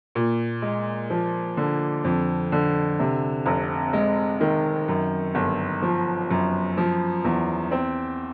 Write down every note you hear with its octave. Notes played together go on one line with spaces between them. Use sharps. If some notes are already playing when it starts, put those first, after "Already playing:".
A#2
G#3
F3
D3
F2
D3
C3
F1
G#3
D#3
F#2
G1
F3
F#2
F3
E2
C4